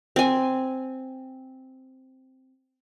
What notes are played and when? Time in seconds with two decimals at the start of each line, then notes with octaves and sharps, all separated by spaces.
0.16 C4 G#5